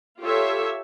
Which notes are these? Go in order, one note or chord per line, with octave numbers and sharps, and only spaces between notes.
F4 G4 A4 C#5 E5